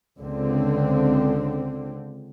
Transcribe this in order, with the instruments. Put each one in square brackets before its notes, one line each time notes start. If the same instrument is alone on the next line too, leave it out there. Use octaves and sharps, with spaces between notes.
[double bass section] C#2 D3 C4